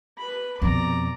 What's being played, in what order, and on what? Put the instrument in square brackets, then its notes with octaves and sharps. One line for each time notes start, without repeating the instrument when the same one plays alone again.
[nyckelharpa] B4 B5
[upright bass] F2 B2 [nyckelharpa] D5 A#5